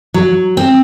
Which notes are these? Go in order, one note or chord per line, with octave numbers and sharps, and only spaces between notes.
F#3
C4